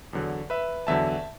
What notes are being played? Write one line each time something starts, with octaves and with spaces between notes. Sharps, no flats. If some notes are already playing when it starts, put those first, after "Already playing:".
E2 D3 F#3
B4 E5
E2 D3 F#3 E5 A5